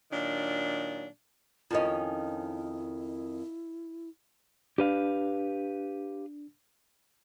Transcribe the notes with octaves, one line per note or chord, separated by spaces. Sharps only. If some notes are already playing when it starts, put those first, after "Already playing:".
A#2 D#3 F#3 D4
F2 D#3 C#4 E4 F4 D#5
D4 G4 B4 F5